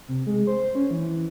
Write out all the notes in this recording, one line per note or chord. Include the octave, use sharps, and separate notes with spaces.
C3
G#3
C5
C#4
E3